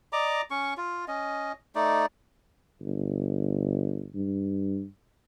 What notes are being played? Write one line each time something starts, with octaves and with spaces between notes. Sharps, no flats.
D5 D#5 A#5 D6
C#4 C#6
F4
C#4 D#5
A3 D#4 D5
G1
G2